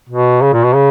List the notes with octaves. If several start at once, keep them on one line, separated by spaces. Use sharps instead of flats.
B2
C#3
A#2
B2
C#3